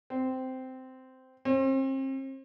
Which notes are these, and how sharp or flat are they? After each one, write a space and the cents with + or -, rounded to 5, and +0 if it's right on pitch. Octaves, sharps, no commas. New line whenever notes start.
C4 -10
C4 +40